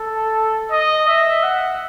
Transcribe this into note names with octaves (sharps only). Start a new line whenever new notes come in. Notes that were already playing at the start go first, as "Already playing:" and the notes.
Already playing: A4
D#5
E5
F#5